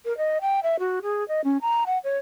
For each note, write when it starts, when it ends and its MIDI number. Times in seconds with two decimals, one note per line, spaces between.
0.05 0.16 70
0.17 0.38 75
0.41 0.60 79
0.63 0.76 76
0.79 0.99 66
1.02 1.26 68
1.28 1.41 75
1.44 1.57 61
1.61 1.83 82
1.86 1.98 78
2.04 2.18 73